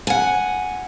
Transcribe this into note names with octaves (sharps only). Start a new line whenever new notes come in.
F#5 G#5